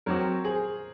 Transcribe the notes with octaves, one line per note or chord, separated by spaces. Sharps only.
F#3 C4 F#4 A#4 C#5
G#4 C5